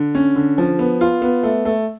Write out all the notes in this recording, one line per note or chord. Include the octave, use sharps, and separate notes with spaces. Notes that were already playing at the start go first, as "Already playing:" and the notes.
Already playing: D3
C#4
D3
F3
B3
F4
B3
A3
A3